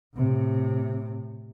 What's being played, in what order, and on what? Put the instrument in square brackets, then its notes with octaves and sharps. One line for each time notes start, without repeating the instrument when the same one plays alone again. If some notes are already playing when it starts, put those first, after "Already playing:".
[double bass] A2 C3